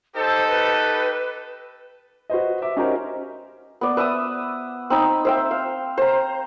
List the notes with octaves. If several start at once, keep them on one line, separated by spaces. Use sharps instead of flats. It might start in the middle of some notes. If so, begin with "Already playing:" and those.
D#4 G4 A4 C5
B4
F#4 B4 C5 D#5
E5 D6
C#4 D#4 F#4 G4 A#4 C5
B3 D5
B4 E5 D6 D#6
C4 D#4 B5
C5 E5 G5
F5
C5 A#5